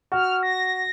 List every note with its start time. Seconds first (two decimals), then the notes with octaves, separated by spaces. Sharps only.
0.12 F#4 F6
0.43 A#6